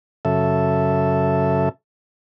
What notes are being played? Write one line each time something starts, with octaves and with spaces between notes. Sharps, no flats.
F#2 C#3 A4 E5